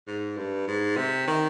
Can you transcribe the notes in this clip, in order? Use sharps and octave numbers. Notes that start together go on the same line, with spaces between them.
G#2
G2
G#2
C3
D#3